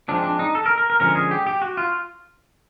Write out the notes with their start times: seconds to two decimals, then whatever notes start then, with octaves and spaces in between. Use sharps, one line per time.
0.08 F3 G#3 C4 D4
0.24 D4
0.39 D#4
0.55 A4
0.66 A#4
0.78 A#4
0.90 A#4
1.00 D3 F3 G#3 C#4 A#4
1.15 G#4
1.31 G4
1.47 G4
1.62 F#4
1.77 F4